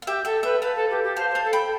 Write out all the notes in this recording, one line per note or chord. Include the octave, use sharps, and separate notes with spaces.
F5
G4 E5 G5
A4 E5 G5
B4 E5 G5
B4 F5 A5
A4
G4
G4
C5 F5 A5
C5
F5 A5
A4
G5 B5